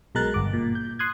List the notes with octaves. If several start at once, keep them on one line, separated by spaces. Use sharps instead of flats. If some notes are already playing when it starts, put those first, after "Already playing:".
B1 B2 G#3 A#4 F#6 A6
G1 D6
A#2
G6
C6 D#6 F#6 G#6